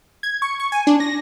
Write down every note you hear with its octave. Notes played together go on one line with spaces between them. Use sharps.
G#6
C#6
C#6
G#5
D4
A#6